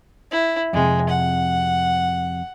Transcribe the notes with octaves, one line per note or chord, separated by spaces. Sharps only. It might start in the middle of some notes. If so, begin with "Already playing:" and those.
E4
F2 C3 G#3
F#5